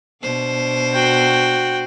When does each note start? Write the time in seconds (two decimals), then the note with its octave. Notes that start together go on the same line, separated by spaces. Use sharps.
0.23 B2 D4 C5
0.93 F#4 G5